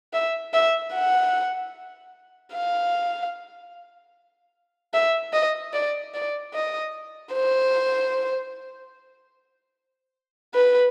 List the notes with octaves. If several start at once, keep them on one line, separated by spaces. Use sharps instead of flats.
E5
E5
F#5
F5
E5
D#5
D5
D5
D#5
C5
B4